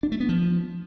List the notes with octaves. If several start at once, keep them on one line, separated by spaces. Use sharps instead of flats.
D4
A3
B3
F3